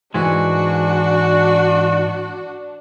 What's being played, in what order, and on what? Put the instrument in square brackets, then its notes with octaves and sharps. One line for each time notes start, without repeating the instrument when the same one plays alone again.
[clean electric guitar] G#2 E3 G#3 [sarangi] D4 [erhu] F#4